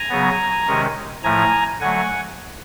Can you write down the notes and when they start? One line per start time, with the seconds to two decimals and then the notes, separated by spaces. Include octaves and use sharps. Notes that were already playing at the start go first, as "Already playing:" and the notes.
Already playing: G#5 A#5
0.10 C#3 F#3 B3
0.67 C3 D#3 G#3 C#4
1.24 A2 F3 A3 G#5 A#5
1.80 D3 F#3 A3 F#5 G#5